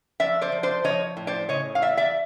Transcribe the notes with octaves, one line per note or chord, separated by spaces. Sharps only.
F3 D5 E5
C5 D5
F3
C5 D5
F3 C#5 D#5
A2
C5 D5
C#3 C#5 D#5
F5
E2 D5 E5
D5 E5